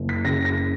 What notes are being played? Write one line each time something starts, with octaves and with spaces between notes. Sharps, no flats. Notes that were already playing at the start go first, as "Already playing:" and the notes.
Already playing: F#1
B6
C#3 A#6
A#6